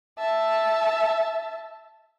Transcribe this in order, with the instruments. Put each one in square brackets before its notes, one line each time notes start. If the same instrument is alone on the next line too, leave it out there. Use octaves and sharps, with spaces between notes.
[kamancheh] E5 A5